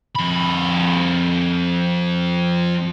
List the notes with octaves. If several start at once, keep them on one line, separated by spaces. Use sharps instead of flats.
F2 B5